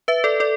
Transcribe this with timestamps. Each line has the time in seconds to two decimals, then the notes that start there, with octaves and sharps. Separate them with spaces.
0.08 B4 E5
0.24 A4 D5
0.40 A4 D5